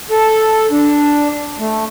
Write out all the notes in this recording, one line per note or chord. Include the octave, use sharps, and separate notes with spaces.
A4
D4
A3